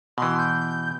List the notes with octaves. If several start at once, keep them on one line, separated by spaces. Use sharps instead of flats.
B2 E3 C6
G6